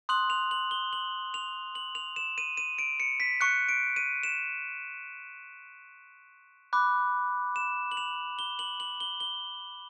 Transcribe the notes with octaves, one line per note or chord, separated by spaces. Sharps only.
C6 D#6 F#6 F#7
F7
F#7
G7
F#7
F7
F#7
F7
E7
D#7
D#7
D7
C#7
B6
C#6 F#6 C#7
D7
D#7
E7
B5 D6 F#6
E7
F#7
F7
G7
F#7
F#7
G7
G7